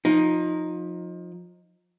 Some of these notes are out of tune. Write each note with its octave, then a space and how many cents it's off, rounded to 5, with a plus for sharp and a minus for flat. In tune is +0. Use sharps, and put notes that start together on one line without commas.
F3 +25 D#4 +0